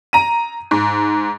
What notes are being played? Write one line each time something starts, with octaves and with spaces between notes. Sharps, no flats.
A#5 D#7
G#2